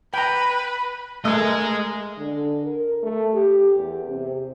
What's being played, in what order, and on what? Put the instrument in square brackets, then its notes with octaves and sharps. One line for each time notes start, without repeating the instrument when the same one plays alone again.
[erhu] B4 [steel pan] G5 A#5
[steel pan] A3 [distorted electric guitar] G#4 D#5 [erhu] A#4
[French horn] D3
A#4
A3
G4
E2
C3